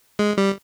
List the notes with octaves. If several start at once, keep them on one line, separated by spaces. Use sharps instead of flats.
G#3
G3